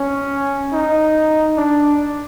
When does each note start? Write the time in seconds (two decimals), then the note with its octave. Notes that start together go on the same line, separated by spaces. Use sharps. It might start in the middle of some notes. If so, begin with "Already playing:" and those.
Already playing: C#4
0.72 D#4
1.57 D4